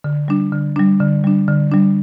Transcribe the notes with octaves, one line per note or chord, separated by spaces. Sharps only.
D3
G3 D4
D3
G3 D4
D3
G3 D4
D3
G3 D4